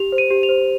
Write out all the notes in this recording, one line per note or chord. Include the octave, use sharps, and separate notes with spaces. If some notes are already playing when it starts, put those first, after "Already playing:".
Already playing: G4 F7
C5
D#7
G4
F7
C5